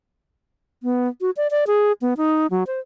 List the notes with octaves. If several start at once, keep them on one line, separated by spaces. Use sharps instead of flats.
B3
F#4
D5
D5
G#4
B3
D#4
F#3
C5